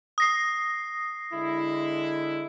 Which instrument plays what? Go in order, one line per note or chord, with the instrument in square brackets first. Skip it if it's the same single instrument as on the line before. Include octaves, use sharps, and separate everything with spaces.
[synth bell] D#6 A#6 C7
[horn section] D3 G#3 E4